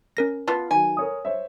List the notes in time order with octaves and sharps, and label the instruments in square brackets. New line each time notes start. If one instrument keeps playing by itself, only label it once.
[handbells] C#4 A#4 A#6
[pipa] B3 F4 [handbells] A5
[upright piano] D#3 F#3 [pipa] G#5
[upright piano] A#4 C#5 D#6
C5 C#5 E5